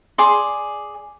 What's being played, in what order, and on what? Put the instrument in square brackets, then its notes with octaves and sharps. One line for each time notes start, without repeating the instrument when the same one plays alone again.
[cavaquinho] G#4 D5 C6